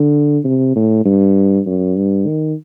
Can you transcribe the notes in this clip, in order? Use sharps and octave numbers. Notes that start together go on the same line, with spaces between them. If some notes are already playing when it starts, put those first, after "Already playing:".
Already playing: D3
C3
A2
G2
F#2
G2
D#3